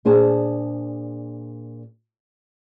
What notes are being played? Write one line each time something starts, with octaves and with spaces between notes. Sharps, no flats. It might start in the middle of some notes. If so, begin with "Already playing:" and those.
A#2 D4 G#4 C5 A5